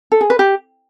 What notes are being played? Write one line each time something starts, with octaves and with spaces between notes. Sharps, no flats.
A4
G#4
B4
G4